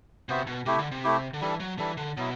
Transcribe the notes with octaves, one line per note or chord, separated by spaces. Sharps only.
C3 B3 F#4 C5 E5
B2
C3 A3 E4 G4
D3
C3
A3 E4 G4
D3
E3 G3 D4 A4
F#3
E3 G3 D4 A4
D3
B2 F#3 B3 E4